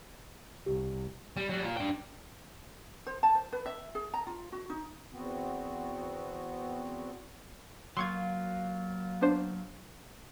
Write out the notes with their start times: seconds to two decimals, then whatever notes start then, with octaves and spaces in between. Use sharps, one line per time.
0.66 C2 G4
1.37 G3
1.49 F#3 G3
1.65 F4 A#5
1.77 D4 G5
3.07 C5
3.23 A5
3.35 C5
3.53 B4
3.66 E5
3.95 G#4
4.14 A#5
4.27 F4
4.52 F#4
4.70 D#4
5.12 E2 B3 C4 F#4
7.97 F#3 A#3 F4 C6 C#6 G#6
9.21 B3 D4 C5